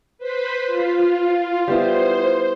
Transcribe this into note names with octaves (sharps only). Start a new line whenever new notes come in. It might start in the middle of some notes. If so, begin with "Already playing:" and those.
B4 C5 B5
F4
G3 B3 E4 C5